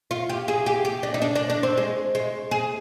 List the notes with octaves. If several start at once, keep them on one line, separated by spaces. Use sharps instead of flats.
F4
G4
G#4
G4
G4
D4
D#4
D4
D4
D4
C4
G#3
G#3
G#4